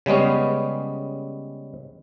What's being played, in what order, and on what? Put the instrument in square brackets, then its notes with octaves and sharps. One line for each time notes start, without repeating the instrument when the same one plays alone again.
[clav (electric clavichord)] C#3 G3 G#3 B3 C#4